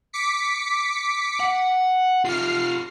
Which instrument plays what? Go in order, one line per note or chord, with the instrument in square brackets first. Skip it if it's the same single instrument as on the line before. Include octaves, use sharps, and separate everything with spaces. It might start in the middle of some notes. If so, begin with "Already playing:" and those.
[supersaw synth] D6 B6 C#7
[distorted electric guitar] F#5
[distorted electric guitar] F4 G4 [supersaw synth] F6 C7